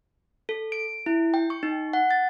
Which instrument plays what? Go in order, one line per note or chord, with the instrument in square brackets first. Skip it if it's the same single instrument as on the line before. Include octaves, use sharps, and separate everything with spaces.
[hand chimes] A4
D7
E4
G5
C#6
D#4
F#5
A6